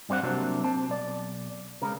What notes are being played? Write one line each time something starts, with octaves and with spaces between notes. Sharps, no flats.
G2 G3 C4 C#5 F#5
C3 F#3 G3 A#3 C4 D4
C4 A5
B1 D5
C#2 C#3 A#4